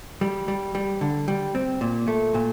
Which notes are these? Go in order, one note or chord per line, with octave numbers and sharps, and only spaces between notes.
G3
G3
G3
D3
G3
C4
A#2
A3
A#2